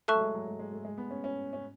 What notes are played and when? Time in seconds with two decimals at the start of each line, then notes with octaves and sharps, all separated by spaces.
0.08 A3 A4 E5 A5 C#6 F#6
0.15 F#3
0.21 G#3
0.34 F#3
0.46 G#3
0.59 G#3
0.72 A3
0.85 G#3
0.98 B3
1.11 C#4
1.24 C#4
1.53 C#4